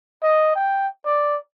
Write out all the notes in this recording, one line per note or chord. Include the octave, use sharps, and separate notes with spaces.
D#5
G5
D5